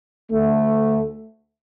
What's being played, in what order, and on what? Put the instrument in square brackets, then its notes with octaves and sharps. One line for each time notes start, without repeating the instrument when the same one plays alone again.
[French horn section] D2 D3 A3